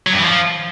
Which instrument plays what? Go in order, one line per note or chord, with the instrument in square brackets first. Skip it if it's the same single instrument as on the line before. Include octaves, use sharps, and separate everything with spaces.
[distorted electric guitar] F#3
G2
E3
F3